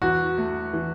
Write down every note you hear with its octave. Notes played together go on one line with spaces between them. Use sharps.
E2 F#4
A3
E3